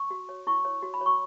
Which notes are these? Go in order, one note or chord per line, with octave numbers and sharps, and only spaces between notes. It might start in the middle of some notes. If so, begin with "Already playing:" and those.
Already playing: C#6
F#4
C#5
E4 C#6
C#5
F#4
B5
C#5 C#6